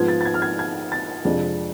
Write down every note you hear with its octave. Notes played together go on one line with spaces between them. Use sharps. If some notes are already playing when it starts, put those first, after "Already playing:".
Already playing: G#2 F3 B3 F4 G#6
A6
A6
G#6
F6
G#6
G#6
A6
F2 C3 F3 G#3 D4